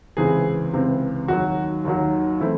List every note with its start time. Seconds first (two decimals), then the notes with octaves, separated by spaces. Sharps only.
0.17 C#2 C3 E3 C4 G#4
0.73 C#2 C3 E3 C4
1.28 D#2 D#3 F#3 F#4
1.85 D#2 D#3 F#3
2.40 E3 A3 C4 E4